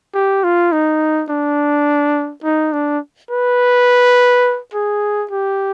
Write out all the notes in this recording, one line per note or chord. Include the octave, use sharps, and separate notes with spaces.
G4
F4
D#4
D4
D#4
D4
B4
G#4
G4